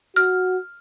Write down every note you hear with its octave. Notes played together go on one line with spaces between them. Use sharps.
F#4 F6